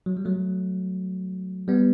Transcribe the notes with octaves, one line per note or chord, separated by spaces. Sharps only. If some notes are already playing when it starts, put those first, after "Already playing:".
F#3
G3
F#3 A3
G3 B3